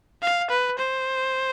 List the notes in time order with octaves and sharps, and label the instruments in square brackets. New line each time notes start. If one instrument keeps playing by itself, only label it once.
[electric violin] F5
B4
C5